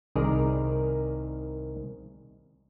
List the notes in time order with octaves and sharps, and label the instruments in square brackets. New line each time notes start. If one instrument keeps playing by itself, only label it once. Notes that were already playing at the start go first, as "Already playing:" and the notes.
[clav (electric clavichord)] C2 D#3 G#4 A#4 D5 A#5